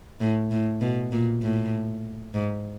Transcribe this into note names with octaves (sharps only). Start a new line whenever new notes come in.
A2
A2
B2
A#2
A2
G#2